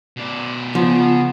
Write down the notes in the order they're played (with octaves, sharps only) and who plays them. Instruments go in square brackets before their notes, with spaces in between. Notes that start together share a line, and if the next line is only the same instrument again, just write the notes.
[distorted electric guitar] B2 D5
[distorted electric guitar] C#3 [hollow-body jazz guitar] F3 [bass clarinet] B3